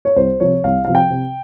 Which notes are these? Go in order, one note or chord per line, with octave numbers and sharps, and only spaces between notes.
C#5
C2 C5
C3 F3 C#5
C2 F5
C3 F3 F5
G5
C3